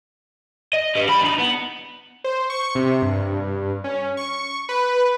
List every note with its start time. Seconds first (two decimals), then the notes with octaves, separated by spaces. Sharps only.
0.73 D#5
0.95 G4 B4
1.09 G3 B5
1.21 D4 D#4
1.38 B3
2.24 C5
2.50 C#6
2.75 C3
3.02 G2
3.84 C#4
4.17 C#6
4.69 B4